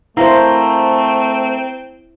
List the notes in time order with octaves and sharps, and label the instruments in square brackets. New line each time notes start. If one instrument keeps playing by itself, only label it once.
[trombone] A3 [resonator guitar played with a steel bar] A#3 [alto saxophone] C4 [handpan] E4 C5